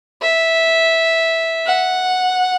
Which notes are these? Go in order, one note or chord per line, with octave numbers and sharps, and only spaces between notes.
E5
F#5